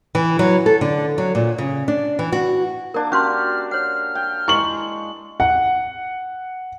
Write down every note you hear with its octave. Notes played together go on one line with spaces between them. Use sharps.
E3
F#3
A4
D3
F#3
A#2
C#3
D4
E3
F#4
A#3 D4 A#4 D5
C#4 F#4 G4 F5 C6 F6
C#5 F#5 F6
G5
G#3 E4 C#6 F#7
F#5